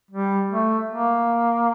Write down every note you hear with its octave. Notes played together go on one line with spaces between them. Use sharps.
G3
A3
A#3